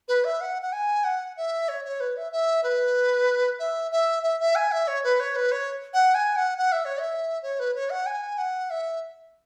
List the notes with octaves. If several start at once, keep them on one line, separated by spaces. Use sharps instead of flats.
B4
E5
F#5
F#5
G#5
F#5
E5
C#5
C#5
B4
E5
E5
B4
E5
E5
E5
E5
G#5
E5
C#5
B4
C#5
B4
C#5
F#5
G#5
F#5
F#5
E5
C#5
E5
C#5
B4
C#5
F#5
G#5
F#5
E5